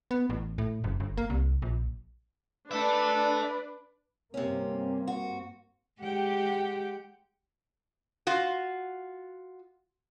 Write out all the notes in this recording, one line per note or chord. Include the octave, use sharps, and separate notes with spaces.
B3
A1
A2
F#1
G1
A#3
C2
A#1
D4 A4 B4 D5 E5
G2 C3 A#3 C4 C#4
F#4
G#3 G4 F#5 G5
F4 F#4